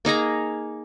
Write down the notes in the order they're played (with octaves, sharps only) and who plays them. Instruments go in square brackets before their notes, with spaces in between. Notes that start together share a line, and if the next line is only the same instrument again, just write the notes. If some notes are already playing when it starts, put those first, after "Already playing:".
[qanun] A#3 D#4 G#4 A#5